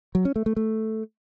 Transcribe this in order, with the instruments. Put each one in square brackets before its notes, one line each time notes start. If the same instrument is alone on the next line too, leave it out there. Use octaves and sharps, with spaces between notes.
[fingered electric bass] F#3
C#4
A3
A3
A3